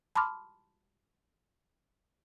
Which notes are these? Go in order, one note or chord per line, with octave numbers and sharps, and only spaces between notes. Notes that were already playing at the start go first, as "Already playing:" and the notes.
A5 B5 C6 D6 F6